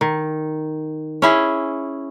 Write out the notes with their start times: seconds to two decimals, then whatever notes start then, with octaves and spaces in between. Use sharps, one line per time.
0.01 D#3
1.22 C#4 E4 G#4